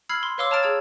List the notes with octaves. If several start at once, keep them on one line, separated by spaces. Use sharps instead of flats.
B5 E6 F6 G#6 C7 F#7
C6
B4 C#5 F5 C6 D6 E6
C#5 A5 A#5 F6 A6 D7
G#4 E6 G#6